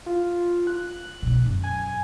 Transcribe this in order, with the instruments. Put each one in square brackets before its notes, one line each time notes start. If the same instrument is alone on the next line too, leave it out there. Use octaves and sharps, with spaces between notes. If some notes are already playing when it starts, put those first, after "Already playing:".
[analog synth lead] F4
F#6
[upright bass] B2 D#3
F#2 B2
[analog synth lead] G#5